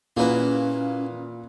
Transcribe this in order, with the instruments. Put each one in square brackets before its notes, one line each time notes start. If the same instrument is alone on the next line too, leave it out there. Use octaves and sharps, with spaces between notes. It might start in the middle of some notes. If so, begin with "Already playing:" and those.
[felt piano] A#2 [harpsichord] A#3 E4 F#4 [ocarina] C#4 [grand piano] G#4 B4